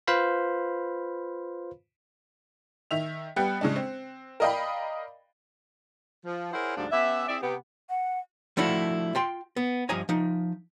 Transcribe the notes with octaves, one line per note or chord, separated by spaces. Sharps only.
F4 B4 C5 F5 B5
D#3 E5 F7
G3 B3 G5 F#6 C#7
C#3 G#3 D4
C4
A#4 D5 D#5 F5 G5 B5
F3
E4 G#4 A#4 C5 C#5 F#5
D2 G#2 F3 G3 D4
B3 C#4 G4 E5
C4 E4 G#4 D5 E5
C3 B3 G4
F#5
F3 A3 D4 E4 F#4
F4 G5 C6
B3
G2 F3 D#5 G#5 A#5
F3 D#4